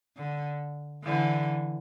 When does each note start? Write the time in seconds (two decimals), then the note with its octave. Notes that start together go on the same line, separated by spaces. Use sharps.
0.17 D3
1.04 D3 E3